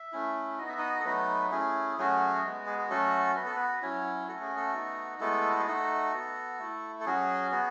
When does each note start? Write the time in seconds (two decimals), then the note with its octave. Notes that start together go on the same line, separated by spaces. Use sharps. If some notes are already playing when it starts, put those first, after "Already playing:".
Already playing: E5
0.12 A3 C#4 E4
0.59 B3 D#4 F#4 D#5
0.69 E5
0.78 D#4 D#5
1.00 A4
1.05 F#3 A3 B3 D#4 B4
1.51 A3 C#4 E4 G#4
1.98 F#3 A3 C#4 F#4 G#4
2.43 G#3 B3 F#4
2.67 G#4
2.78 G#4
2.90 F#3 A3 C#4 F#4 A4
3.36 B3 F#4 B4
3.46 A4
3.56 B3 B4
3.82 F#3 C#4 E4 C#5
4.28 A3 C#4 F#4 A4
4.42 G#4
4.56 A3 A4
4.74 B3 D#4 F#4
5.20 G#3 A3 B3 E4 A4
5.51 F#4
5.59 G#4
5.67 A3 D#4 F#4 A4
6.13 B3 F#4
6.59 A3 E4
7.00 A4
7.05 F#3 C#4 F#4 G#4
7.51 B3 F#4 G#4